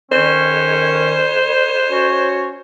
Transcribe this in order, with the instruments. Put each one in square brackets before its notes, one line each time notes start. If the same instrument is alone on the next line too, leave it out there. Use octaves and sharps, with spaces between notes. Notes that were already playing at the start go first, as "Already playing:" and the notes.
[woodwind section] D#3 C#4 [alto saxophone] C5
[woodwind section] C#4 F#4 C#5